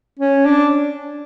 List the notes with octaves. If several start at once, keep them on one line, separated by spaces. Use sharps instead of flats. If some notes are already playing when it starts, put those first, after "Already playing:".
C#4
D4